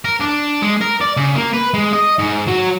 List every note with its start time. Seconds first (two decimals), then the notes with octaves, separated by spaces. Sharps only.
0.05 A#4
0.20 D4
0.62 G#3
0.81 A#4
1.01 D5
1.17 C#3
1.35 A#3
1.54 B4
1.74 G#3
1.93 D#5
2.19 G#2
2.48 F#3